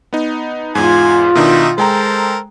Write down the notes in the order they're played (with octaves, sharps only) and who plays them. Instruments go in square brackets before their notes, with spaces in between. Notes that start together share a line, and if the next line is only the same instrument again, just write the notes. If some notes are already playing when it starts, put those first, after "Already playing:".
[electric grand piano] B3 D#4
[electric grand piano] E2 G#2 [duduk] F4 [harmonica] G#5
[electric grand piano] B2 D#3 D4 [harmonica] D#4 E5
[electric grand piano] G#3 G5 A#5 [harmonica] A4 A#4 C5